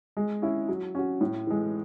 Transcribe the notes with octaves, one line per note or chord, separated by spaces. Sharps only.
G#3
C#4 E4
F#3
C#4 F#4
A2
E3 G#3